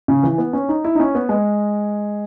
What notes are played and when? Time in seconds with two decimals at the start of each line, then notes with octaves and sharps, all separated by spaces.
0.08 C#3
0.23 E3
0.38 B3
0.53 C#4
0.69 D#4
0.84 E4
0.95 D#4
1.00 C#4
1.15 B3
1.29 G#3